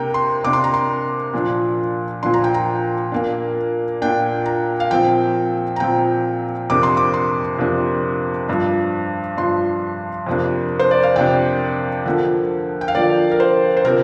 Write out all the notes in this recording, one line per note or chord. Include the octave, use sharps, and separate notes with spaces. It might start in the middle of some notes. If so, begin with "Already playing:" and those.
Already playing: C3 A#3 D4 G5 A#5
C6
C3 A#3 D4 D6
C6
A#5
C6
A#2 F3 D4
A#2 F3 D4 C6
A#5
G5
A#5
A#2 A#3 D4
A#2 A#3 D4 G5
A#5
F5
A#2 F3 C4 G5
A#5
A#2 F3 C4 G5
F2 C3 A#3 D4 D6
C6
D6
C6
F2 C3 A#3 D4
G2 F3 D4
G2 F3 D4 C6
F2 C3 A#3 D4
C5
D5
F5
F2 C3 A#3 D4 G5
D3 F3 A#3
G5
F5
D3 F3 A#3 D5
A#4
C5
C5
C3 F3 C4 A#4